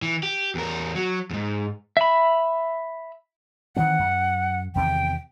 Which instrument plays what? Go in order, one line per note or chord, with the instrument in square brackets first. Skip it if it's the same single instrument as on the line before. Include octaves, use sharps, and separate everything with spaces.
[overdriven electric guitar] E3
G4
E2 A#4
F#3
E2 G#2
[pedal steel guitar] E5 B5
[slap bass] D#3 E3 C4 [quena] F#5
[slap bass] F#2
[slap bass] E2 C3 D#3 [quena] G5